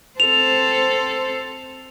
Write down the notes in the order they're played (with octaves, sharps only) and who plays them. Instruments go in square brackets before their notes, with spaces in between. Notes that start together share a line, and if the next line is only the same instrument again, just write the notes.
[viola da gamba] C4 A4 C5 [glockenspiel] F7